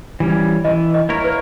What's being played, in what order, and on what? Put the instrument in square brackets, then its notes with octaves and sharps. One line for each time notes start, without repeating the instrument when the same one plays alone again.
[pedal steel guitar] E3 G3 C#4
[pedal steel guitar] E3 [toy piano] D#5
[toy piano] D#5
[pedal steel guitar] A#3 E4 A#4 C#5
[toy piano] B4